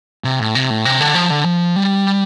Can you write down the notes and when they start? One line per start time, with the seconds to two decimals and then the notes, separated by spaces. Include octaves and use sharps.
0.24 C3
0.40 A2
0.55 C3
0.70 A2
0.85 C3
1.00 D3
1.15 F3
1.30 D3
1.45 F3
1.76 G3